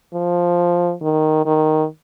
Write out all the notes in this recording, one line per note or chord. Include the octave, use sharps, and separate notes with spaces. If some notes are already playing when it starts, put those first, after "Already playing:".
F3
D#3
D#3